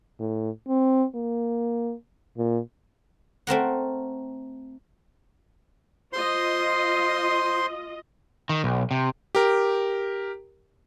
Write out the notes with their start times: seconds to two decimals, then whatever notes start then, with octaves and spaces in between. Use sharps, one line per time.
0.19 A2
0.68 C4
1.15 A#3
2.37 A#2
3.47 A3 C4 A#4 F#5
6.13 F4 C5 D#5 C6
8.49 D#3
8.64 B1
8.91 C3
9.35 G4 A#4